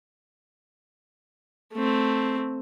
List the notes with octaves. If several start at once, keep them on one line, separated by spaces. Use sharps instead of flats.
A3 C4